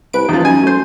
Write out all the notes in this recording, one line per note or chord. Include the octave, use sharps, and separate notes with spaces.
C2 B4 D7
D#1 E2 F3 D#4
F#2 G#5
F#2 A3 C5